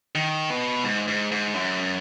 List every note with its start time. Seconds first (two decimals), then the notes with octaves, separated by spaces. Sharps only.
0.15 D#3
0.50 B2
0.84 G#2
1.08 G#2
1.31 G#2
1.54 F#2